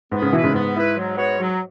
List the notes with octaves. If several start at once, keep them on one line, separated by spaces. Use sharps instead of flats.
G#2 B3
G#2 C#3
B2 E3 E4 B4
G#2 C#3
G#2 B3
E4 B4
F#3
B3 F#4 C#5
F#3